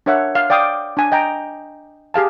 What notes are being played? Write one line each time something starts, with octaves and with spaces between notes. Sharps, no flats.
D4 A#4 C#5 E5 F#5
F5
D5 F5 G5 D6 D#6
D4 G#5
D#5 G5 G#5 A#5
G4 G#4 F5 A5